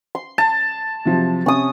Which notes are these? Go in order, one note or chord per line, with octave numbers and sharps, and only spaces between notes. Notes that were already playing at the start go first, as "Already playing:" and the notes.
C6
A5
C3 F3 F#3
C3 C#4 D#6